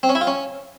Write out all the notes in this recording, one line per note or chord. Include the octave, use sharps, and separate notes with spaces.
C4
C#4
E4
F4
C#4